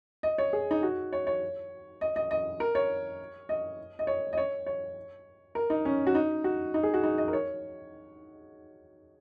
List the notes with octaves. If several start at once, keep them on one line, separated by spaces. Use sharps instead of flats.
D#5
C#5
G#4
D#4
F#4
C#5
C#5
D#5
D#5
D#5
A#4
C#5
D#5
D#5
C#5
D#5
C#5
C#5
A#4
D#4
C#4
F#4
D#4
F#4
D#4
G#4
F#4
D#4
D#5
A#4
C#5